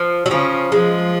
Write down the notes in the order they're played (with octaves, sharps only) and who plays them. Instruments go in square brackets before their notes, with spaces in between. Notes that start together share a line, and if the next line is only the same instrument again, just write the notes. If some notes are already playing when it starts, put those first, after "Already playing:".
Already playing: [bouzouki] F3
F#3
[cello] C#3 [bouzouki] F3
[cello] F3 [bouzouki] G#3